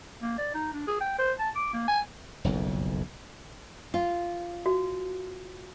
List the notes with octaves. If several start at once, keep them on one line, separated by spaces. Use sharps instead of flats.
A#3
D5
D#4
D4
G#4
G5
C5
A5
D6
A#3
G#5
F#1 B1 F2
F4
F#4